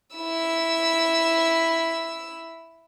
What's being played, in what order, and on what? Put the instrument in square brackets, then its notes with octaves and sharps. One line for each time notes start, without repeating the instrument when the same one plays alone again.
[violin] E4 E6